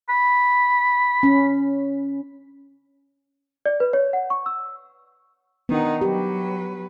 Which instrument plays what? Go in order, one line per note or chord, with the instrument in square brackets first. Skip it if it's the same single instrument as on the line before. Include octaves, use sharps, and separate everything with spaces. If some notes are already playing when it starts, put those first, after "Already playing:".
[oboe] B5
[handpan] C#4
[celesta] D5
B4
C#5
F#5
C#6
E6
[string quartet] D#3 D#4 F#5 [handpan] B3 D4
[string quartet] F#3 B4 [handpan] G4